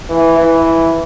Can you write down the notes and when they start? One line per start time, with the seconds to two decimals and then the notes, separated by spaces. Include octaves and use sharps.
0.10 E3
0.38 E3